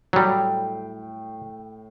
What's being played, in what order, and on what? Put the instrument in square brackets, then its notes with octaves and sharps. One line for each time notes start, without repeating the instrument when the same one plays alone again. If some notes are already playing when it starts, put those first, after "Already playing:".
[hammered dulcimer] A2 G5 [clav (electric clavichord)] F#3 G3